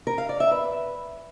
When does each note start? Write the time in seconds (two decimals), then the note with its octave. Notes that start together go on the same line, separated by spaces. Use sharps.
0.07 A#4
0.18 F5
0.29 D5
0.40 E5
0.51 B4